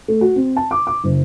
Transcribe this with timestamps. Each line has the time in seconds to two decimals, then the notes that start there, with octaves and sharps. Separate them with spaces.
0.08 A3
0.21 F#4
0.36 C4
0.56 A5
0.71 D6
0.87 D6
1.04 F#1